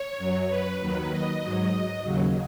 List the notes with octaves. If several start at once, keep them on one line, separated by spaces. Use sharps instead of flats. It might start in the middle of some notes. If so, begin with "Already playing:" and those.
Already playing: C#5
F#2 F#3
B4
D#2 D#3 F#3 B4
D#5
G#2 F#3
D#2 C#3 F#3